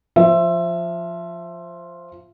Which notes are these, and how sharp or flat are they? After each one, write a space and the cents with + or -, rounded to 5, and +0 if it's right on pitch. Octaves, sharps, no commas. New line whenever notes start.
F3 +0 E5 +20